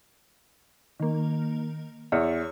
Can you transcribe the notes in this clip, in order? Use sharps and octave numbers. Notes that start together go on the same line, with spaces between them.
D#3 A#3
E2 C#5